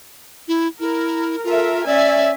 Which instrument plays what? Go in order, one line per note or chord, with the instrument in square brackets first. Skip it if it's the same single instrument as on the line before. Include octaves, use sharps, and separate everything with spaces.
[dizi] E4
[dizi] E4 [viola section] A#4
[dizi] F4 [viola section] A4 A#4 E5
[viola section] C#4 E5 G#5 [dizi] D5